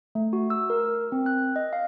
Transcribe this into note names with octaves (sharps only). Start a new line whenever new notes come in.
A3
F#4
E6
A#4
C4
F#6
D#5
F5